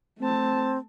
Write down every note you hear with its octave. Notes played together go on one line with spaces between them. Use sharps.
A3 C4 A5